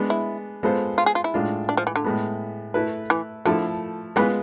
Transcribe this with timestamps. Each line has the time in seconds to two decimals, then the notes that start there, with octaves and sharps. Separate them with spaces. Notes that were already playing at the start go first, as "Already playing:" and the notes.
Already playing: G#3 B3 D4
0.10 E4
0.63 G#3 B3 F4 A4 C5
0.98 F4
1.06 G#4
1.15 F4
1.24 E4
1.34 A2 G#3 D4 F4
1.69 D4
1.77 F3
1.87 E3
1.96 D3
2.04 A2 G#3 B3
2.74 A3 E4 B4
3.10 E3
3.45 D3 F3 A3 E4 A4
4.16 E3 G#3 B3 F4 B4